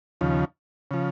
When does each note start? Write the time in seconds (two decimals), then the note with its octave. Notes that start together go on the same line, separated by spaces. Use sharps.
0.21 D#2 C#3 F3
0.91 C#3 F3